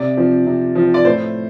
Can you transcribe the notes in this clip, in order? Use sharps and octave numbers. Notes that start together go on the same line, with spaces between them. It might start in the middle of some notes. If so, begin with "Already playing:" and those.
Already playing: C3 D5
F3 C4
C3
F3 C4
D5
A2 C5